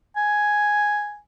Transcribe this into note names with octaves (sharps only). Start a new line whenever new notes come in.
G#5